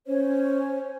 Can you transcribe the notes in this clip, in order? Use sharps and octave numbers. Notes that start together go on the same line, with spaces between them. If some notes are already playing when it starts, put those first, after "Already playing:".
C#4 C5 C#5